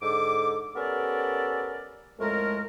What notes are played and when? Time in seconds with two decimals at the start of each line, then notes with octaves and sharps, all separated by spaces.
0.02 G#2 D3 A4 D6
0.75 B3 C#4 G4 A4 A#4 D5
2.18 F2 A2 G#3 A3 A#4